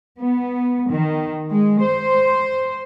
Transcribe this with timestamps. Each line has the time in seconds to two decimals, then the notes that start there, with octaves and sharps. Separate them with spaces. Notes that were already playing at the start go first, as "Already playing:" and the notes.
0.21 B3
0.90 D#3
1.51 G#3
1.83 C5